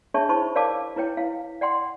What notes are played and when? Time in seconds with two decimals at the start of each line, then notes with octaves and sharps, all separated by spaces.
0.14 D4 G#4 C#5 E5 A5 C#6
0.29 D#4 E4 C5 A5 B5 C#6
0.55 A#4 C#5 D5 F5 A5 D6
0.96 E4 B4 C#5 G5
1.17 E4 F5
1.61 D5 F#5 G5 C6